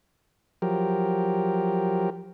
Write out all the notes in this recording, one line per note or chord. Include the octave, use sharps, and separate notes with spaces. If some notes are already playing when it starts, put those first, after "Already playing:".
F3 F#3 G4 A#4